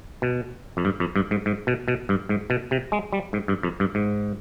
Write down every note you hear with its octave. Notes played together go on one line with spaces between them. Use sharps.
B2
F2
G2
F2
G2
G#2
G#2
B2
B2
G2
G#2
B2
C3
G#3
G3
G#2
G2
F2
G2
G#2